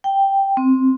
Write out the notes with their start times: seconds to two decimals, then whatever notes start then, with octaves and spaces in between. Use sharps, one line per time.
0.04 G5
0.57 C4